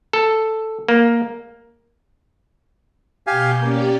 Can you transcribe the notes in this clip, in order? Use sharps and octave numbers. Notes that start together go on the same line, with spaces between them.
A4
A#3
B2 G4 F5 G#5 G6
A#3 C#4 G4 D5